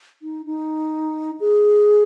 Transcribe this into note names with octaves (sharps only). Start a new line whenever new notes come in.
D#4
D#4
G#4